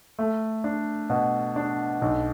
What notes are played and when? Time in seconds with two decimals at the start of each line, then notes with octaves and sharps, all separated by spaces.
0.19 A3
0.64 D4
1.10 B2
1.56 D4
2.02 B1